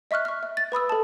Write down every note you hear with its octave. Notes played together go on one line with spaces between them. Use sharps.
D#5 E5 C#6 F6 F#6
C#6 F6
E5
A6
B4 B5 D#6 E6
A4 A5